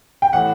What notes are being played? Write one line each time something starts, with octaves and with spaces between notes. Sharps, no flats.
G5
A2 E3 F#5